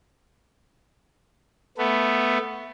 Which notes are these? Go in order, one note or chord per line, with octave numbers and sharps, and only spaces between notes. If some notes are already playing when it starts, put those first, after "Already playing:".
A3 B3